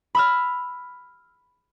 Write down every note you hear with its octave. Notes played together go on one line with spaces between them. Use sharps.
B5 E6 F6